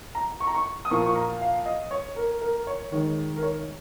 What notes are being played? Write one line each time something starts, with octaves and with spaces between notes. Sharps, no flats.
A#5
C#6
A#5
C#6
D#6
A#2 F3 A#3 C#6
C#6
A#5
F5
D#5
C#5
A#4
A#4
C#5
D#3 G#3 C#5
A#4
C#5